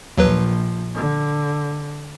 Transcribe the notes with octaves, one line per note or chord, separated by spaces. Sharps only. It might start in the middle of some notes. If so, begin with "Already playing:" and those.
A#1 D#2 F3 F#3 B4
D3